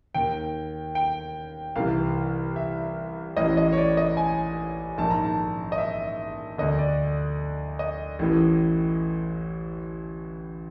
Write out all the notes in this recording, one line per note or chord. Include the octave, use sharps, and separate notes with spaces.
D#2 D#3 G5
G5
C2 C3 E3 F5
E5
A1 A2 E3 D#5
D#5
C#5
D5
D#5
G#5
A#1 G#2 D#3 A5
A#5
A5
D#5
E5
D2 D3 D#5
D5
D#5
A1 A2 E3